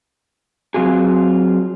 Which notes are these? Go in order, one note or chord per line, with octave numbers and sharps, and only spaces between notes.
F#3 C4 F4 F#4 G#4